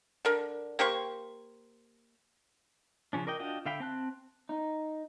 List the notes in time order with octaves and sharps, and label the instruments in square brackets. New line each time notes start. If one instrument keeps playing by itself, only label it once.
[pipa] D3 A#4
A#3 G4 C5 C#6
[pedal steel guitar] C#3 F3 C#4 D4
A#4 D5 D#5 G5
D4 F4 F#4 D#5 G5
D3 E5 F5 G5 B5
C4 A5 F#6
[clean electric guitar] D#4